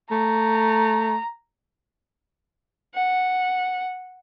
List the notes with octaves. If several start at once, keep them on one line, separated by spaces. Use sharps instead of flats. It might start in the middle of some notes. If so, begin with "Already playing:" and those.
A3 A#5
F#5